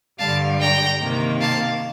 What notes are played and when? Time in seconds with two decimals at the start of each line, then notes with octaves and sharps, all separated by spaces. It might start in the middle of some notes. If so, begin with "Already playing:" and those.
0.18 G2 D3 G3 F5 A5
0.59 G5 A#5
1.00 C3 D#3 A#3
1.40 F5 A5